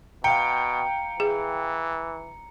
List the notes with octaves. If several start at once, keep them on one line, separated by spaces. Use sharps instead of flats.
B2 F5 G5 A#5 C#7
E3 G#4